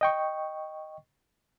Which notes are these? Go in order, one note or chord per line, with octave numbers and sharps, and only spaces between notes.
D#5 G5 C#6